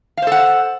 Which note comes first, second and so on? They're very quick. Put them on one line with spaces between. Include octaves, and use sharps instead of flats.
F5 C5 A4 F#5